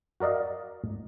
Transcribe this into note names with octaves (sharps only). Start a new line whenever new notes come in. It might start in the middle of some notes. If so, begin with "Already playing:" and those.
F#4 A#4 D5 D#5 F5